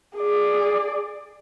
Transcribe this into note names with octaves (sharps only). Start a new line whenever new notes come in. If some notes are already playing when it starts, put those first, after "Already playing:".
G#4 D5